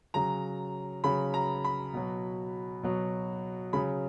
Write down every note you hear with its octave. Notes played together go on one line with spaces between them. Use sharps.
C#3 F#3 A#5
C#3 F#3 B5
A#5
B5
B2 F#3
B2 F#3
C#3 F#3 B5